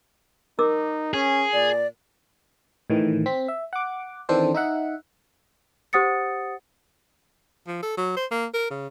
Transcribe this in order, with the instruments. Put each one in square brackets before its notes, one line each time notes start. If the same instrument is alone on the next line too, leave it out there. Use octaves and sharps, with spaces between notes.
[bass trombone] D#4 [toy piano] A#4 D6 E6
[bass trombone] C#4 [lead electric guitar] G#4
[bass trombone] A#2 [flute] D5
[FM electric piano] A2 D#3 E3
C4 B6
E5
F#5 D6
D#3 E3 C4 D4 A4 C5
D#4 E5 F#5
[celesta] G4 C5 F#5 D#6 A6 C#7
[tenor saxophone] F3
A4
F#3
C5
A#3
A#4
C#3